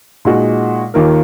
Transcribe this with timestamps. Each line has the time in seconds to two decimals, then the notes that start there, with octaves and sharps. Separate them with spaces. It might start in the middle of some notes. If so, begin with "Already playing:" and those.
0.25 A#2 G#3 D#4 F#4
0.94 D#2 D#3 A#3 F4 A#4